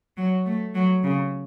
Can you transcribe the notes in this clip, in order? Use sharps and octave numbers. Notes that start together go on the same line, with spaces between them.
F#3
A3
F#3
C#3